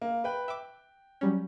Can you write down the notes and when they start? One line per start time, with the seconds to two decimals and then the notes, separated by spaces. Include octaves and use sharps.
0.01 A#3
0.24 B4 G5 F#6
0.48 E5 G5 D6
1.21 F#3 G3 C#4